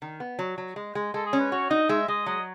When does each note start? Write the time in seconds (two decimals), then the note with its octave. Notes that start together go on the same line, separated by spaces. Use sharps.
0.02 D#3
0.20 B3
0.39 F#3
0.58 F#3
0.76 G#3
0.95 G#3
1.14 G#3 A4
1.26 G#4
1.33 C#4
1.39 B4
1.52 F#4 C#5
1.70 D#4 D#5
1.89 G#3 E5
2.08 G#3 D#5
2.26 F#3 D#5